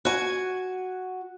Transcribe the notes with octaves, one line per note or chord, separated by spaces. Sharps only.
F#4 G#5